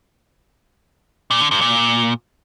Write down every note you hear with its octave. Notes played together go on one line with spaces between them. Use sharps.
A#2
D3
G2
A#2